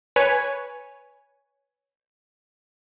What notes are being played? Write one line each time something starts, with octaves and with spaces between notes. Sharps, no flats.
B4 C#5 G#5